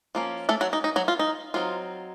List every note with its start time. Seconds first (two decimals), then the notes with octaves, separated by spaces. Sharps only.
0.15 F3 A#3 C#4
0.49 A3 A4
0.61 F#3 F#4
0.73 D#4
0.84 D#4
0.96 F#3 F#4
1.08 F4
1.19 D#4
1.54 F#3 C4 D#4 F4